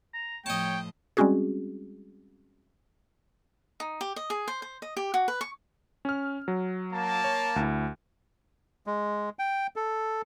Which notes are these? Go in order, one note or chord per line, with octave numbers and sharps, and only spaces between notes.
A#5
A2 F3 C#5 D#5 G5 A5
G3 G#3 C4 C#4 F#4 G#4
D#4
G4
D#5
G#4
C5
C5
D#5
G4
F#4
B4
C#6
C#4 F6
F#3
A#3 A5
C#5
D2 E4
G#3
G5
A4